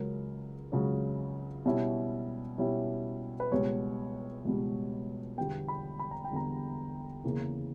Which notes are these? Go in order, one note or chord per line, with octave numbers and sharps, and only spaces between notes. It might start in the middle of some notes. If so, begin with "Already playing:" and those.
Already playing: C#2 C#3 F#3 C#4 A#4
C#2 C#3 F#3 C#4
B2 G3 C#4 E4
B2 G3 C#4 E4
B4
C#2 B2 G3 C#5
C#2 B2 G3
E2 D3 G3 B3 G5
B5
B5
A#5
G5
E2 D3 G3 B3 A#5
E2 C#3 E3 A#3